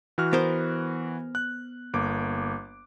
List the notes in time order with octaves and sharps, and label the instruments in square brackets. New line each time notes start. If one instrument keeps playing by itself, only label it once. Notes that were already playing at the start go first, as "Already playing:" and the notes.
[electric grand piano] E3 F#4 F6
[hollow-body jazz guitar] B3 A#4 C5
[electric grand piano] F#6
G1 A#3 D6